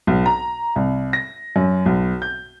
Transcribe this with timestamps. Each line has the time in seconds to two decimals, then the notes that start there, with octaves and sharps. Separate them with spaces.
0.07 B1
0.26 A#5
0.76 C2
1.13 A#6
1.56 F#2
1.86 B1
2.22 G6